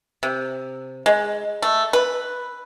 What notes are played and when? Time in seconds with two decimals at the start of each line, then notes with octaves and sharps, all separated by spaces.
0.23 C3
1.06 G#3
1.62 A3
1.93 B4